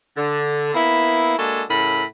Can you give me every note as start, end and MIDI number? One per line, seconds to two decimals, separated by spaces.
0.17 0.72 50
0.75 1.34 58
0.75 1.34 59
0.75 1.34 64
1.39 1.63 56
1.39 1.63 58
1.39 1.63 62
1.39 1.63 66
1.39 1.63 69
1.70 2.04 45
1.70 2.04 49
1.70 2.04 69
1.70 2.04 70
1.70 2.04 83